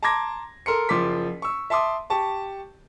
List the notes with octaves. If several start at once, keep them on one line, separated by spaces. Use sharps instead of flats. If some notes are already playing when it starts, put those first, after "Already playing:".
A5 A#5 C6 D6 G#6 A#6
A4 A#4 C6 C#7
F#1 F3 C6 D6 B6
C#6 E6
E5 A5 C6 D6 D#6
G4 A5 C#6